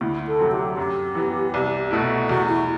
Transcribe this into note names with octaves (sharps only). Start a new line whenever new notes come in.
D2 E4
A4
C3 F#3 C4
G4
F#2 G4
E3 B3
C2
B2 A3 E4
E2 F#4
E4